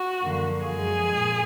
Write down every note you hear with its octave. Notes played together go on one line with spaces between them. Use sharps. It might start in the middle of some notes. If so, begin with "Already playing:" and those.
Already playing: F#4
F#2 D3 F3 A#3
F#2 F3 G#3 G#4
A#2